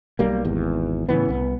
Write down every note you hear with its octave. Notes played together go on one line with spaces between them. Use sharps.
B1 G3 A#3
G#1 E2
A2 C#3 E3 B3
C2 B3